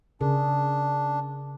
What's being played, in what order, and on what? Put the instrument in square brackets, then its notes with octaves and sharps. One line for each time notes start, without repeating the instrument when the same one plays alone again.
[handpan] C#3 G#4 A#4 [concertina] D4